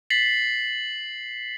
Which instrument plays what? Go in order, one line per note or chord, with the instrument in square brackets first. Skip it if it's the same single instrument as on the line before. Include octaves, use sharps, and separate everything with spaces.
[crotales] A6 B6 C7 F#7